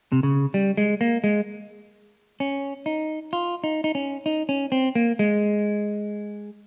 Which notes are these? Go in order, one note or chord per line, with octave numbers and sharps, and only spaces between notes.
C3
C#3
G3
G#3
A#3
G#3
C#4
D#4
F4
D#4
D#4
C#4
D#4
C#4
C4
A#3
G#3